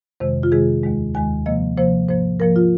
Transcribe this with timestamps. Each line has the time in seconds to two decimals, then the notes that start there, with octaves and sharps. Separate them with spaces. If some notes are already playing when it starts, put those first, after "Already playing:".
0.20 F2 C3 D#3 G#3 C5
0.43 F4
0.52 F2 C3 D#3 G#3 G#4
0.84 D#2 D#3 G#3
1.14 D#2 D#3 G#3 G#5
1.46 C3 F3 A#3 D#5
1.77 C3 F3 A#3 C5
2.08 G#2 F3 A#3 C5
2.40 G#2 F3 A#3 A#4
2.56 F4